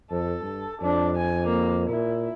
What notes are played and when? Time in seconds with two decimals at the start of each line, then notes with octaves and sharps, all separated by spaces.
0.11 F2 A4
0.42 G2
0.82 F2 D4
1.17 G#5
1.47 A#3
1.89 A#2 E4